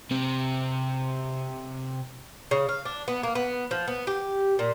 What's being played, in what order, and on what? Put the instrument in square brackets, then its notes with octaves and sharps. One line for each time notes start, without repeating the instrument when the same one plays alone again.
[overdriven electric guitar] C3 C4
[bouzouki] C#3
F5
D4
B3
A#3
B3
F3
B3
G4
A#2